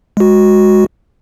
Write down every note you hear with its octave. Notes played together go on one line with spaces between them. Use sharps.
G#3 F#4